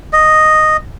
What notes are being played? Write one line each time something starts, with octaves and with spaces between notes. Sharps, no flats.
D#5